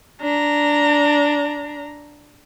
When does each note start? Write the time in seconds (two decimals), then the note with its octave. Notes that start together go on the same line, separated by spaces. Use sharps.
0.21 D4 A#5